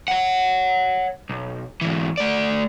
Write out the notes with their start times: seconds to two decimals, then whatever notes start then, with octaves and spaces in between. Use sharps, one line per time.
0.08 C#5 F#5
1.29 B1
1.81 G#2 E3
2.18 A3 D5